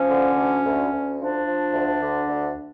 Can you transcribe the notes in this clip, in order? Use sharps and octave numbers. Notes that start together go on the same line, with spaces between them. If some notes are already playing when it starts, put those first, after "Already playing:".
Already playing: F3 C#4
D3
D2
D2
D2
F3 D4
F3
D2
D3
D2